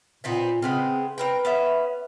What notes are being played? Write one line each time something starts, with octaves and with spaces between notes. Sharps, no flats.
A#2 B3 C4 D#4
C#3 G#3 B3 C4
C4 A#4 B4 G5
B3 C#4 E5